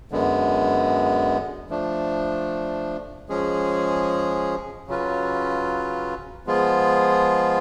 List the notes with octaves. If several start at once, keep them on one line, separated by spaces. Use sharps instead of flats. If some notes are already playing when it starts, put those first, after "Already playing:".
F#2 D3 G#3 B3
F3 A3 D4
F3 G#3 C#4 G#4
C#3 F#3 C#4 F4 B4
F3 G#3 B3 F4 G#4